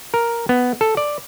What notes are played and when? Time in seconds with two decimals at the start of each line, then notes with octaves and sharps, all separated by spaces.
0.14 A#4
0.49 B3
0.81 A4
0.97 D5